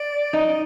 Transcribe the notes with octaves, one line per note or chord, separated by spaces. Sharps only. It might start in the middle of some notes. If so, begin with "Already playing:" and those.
Already playing: D5
D#4 D#5